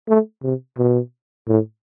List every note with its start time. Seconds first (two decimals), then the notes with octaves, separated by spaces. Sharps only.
0.08 A3
0.43 C3
0.78 B2
1.48 A2